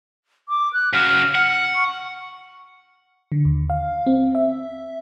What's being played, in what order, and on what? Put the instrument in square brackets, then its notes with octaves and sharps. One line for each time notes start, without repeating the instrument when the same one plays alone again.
[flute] D6
F#6
[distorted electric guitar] C#3 F#4 [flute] F6
[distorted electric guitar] F#5
[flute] C#6
[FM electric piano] D3
D#2
F5
C4
E5